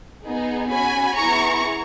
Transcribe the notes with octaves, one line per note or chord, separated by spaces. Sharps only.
B3 D#4 G#4
C#4 F#4 G#5 B5
B3 E4 G#4 A#5 C#6